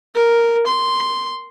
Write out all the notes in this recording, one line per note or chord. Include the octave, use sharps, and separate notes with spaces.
A#4
C6